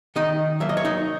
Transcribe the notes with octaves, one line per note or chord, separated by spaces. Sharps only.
D#3 D#4 D#5
F#3 A#3 E5
D#5
C#5
D#4 D#5